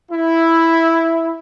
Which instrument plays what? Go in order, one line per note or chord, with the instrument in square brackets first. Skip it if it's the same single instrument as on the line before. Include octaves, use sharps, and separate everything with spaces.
[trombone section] E4